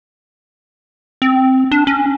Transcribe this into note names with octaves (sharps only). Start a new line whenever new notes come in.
C4
D4
C#4